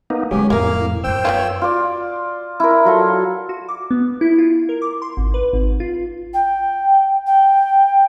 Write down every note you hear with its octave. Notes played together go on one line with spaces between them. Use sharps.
A#3 B3 D#4
D3 F#3 G#3 C#4 G4 G#4
F2 A2 A#3 E4 F4 A#4 F5
F#2 D#4 C5 G5 E6
F3 B3 F4 C#5
F4 D5
E4 A#4
F#3 F4 A4
F#4
D6
B3
E4
F4
A#4
D6
C6
G#1
B4
G#1
F4
G5
G5